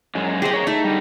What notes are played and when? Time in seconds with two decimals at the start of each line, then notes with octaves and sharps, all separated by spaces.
0.15 F#2 G#3
0.42 G4 G#4 C5 D#5
0.53 A#4 C#5
0.67 A3 D#4
0.84 D3 G3